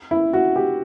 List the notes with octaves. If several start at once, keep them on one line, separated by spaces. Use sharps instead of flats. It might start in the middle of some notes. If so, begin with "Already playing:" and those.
E4
F#4
G4